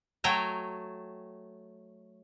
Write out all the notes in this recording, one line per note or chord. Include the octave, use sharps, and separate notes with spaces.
F#3 A3 G5 G#5 A#5